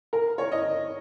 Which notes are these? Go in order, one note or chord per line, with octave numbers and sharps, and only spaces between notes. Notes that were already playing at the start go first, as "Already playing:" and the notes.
A#4
C#5
D#5